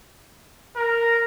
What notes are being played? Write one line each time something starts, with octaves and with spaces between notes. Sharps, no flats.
A#4